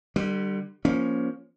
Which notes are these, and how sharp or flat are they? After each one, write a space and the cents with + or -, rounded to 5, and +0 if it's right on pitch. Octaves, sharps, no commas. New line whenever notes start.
D3 +30 G3 -10
F3 +0 A#3 +25 C#4 +10